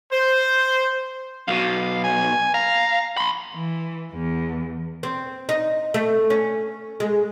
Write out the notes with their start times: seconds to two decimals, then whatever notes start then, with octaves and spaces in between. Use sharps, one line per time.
0.12 C5
1.48 B1 B2 F5
2.04 G#5
2.54 F5 A#5
3.17 B5 C6
3.54 E3
4.13 E2
5.03 C4
5.49 D#4
5.94 A3
6.30 C#4
7.00 G#3